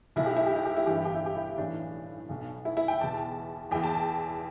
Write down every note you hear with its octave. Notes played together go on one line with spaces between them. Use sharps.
B1 B2 E4
G4
E4
G4
E4
G4
E4
G1 G2 E3 G4
E4
G4
E4
G4
E4
B1 A2 E3 D4
B1 B2
E4
E4
G5
E2 B2 A5
E2 E3 G5
A5
A5